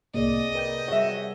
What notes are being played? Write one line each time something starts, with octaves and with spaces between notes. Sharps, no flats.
C2 A2 C3 A#3 G#4 D5 D#5
A#4 B4 G5 G6
G3 F#4 G#4 C#5 E5